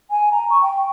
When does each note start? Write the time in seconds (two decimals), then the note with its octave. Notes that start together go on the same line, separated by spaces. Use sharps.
0.11 G#5
0.32 A#5
0.50 C#6
0.62 G5